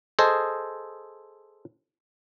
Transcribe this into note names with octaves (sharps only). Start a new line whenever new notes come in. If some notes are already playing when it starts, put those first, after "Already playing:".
G#4 A4 C5 D#5